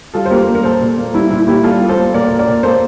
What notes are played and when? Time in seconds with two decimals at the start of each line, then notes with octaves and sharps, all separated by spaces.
0.14 G3 F4 A4
0.25 C5
0.30 A#3 G4 A#4
0.48 G3
0.55 A#4
0.64 A#2 A4 C5
0.81 A#2
0.98 A#3
1.14 G3 E4
1.30 A#2 E4
1.47 A#3 E4 G4
1.63 G3 F4 A4
1.81 A#3
1.89 A4 C5
1.97 A#3
2.14 A#2 A#4 D5
2.31 A#2
2.39 A#4 D5
2.48 A#2
2.63 A#3 A4 C5